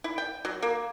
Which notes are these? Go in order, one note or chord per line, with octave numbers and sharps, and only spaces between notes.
E4
G5
F#3
A#3